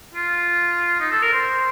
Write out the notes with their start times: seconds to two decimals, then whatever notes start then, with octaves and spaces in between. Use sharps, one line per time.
0.14 F4
1.00 D#4
1.11 A4
1.22 A#4
1.33 C5